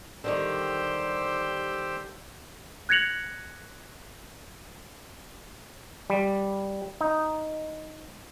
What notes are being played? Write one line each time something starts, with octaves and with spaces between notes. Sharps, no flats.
D3 D#3 G3 G4 C5 E6
F#6 G#6 A#6 C#7 F7 F#7
G3
D#4